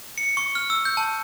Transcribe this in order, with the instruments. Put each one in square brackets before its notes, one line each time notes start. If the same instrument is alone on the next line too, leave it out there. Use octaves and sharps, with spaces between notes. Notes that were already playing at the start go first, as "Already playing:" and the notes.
[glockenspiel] C#7
C#6
F6
E6
G6
A5